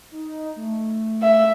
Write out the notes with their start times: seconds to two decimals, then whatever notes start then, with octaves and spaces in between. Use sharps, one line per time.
0.12 D#4
0.56 A3
1.22 E5